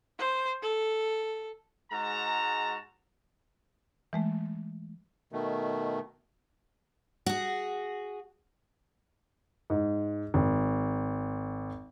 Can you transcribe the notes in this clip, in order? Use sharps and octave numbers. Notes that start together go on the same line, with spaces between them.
C5
A4
G#2 G#3 F#4 A5 A#5
E3 G#3 A3
B2 D#3 A3
F#4 G#4
G#2
G#1